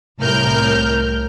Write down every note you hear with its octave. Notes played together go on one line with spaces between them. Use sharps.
C2 A2 A#4 F6 G6